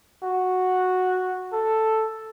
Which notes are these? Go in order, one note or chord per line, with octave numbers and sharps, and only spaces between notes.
F#4
A4